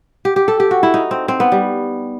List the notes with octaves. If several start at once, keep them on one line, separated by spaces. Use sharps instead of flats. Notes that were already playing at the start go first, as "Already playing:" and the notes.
G4
G4
A4
G4
F#4
E4
D#4
C4
C4
B3
G3